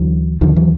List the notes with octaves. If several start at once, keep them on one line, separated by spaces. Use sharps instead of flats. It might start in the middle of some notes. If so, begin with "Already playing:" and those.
Already playing: D2 D3 E3 F#3
D#2 D3 D#3 F3
E3 F#3